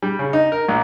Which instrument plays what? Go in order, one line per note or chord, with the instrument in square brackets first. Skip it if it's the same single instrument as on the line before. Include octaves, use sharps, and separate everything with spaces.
[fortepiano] G3
C#3
D#4
A#4
A#1